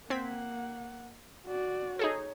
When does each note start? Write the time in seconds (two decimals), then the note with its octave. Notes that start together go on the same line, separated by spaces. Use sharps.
0.10 A#3 C4 F#5 G#6 B6
1.47 F#4 D5
1.99 D#4 G#4 A4 C#5